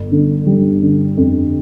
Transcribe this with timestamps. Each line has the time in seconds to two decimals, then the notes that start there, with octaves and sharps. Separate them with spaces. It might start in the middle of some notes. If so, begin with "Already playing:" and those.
Already playing: G1
0.12 D3
0.46 G3
0.82 D3
1.17 F2